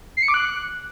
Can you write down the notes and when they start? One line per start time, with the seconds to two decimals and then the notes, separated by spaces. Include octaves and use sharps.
0.17 C7
0.23 C#7
0.28 D6
0.34 F#6